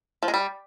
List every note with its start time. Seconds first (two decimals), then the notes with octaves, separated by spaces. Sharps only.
0.23 F3
0.28 G#3
0.34 G3